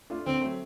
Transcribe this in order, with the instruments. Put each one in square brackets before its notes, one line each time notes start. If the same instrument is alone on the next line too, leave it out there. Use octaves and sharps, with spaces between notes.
[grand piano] A3 D4 F4
[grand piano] D3 [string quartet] C4
[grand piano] F#3 A3